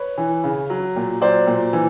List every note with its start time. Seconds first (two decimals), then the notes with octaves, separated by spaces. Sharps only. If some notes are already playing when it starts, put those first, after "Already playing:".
Already playing: B4 C#5
0.18 E3
0.44 C#3
0.70 F#3
0.96 A#2
1.21 F#3 C5 D5
1.47 A#2
1.73 E3